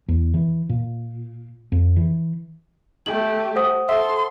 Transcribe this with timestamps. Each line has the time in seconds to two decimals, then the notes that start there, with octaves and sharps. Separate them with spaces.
0.08 E2
0.34 E3
0.69 A#2
1.72 F2
1.96 E3
3.06 A3 G4 F#7
3.56 C5 F#5 D#6
3.89 A4 E5 C6